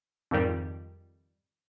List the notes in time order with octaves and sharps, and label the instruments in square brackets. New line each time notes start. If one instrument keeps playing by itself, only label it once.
[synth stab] F2 G#2 D#3 G3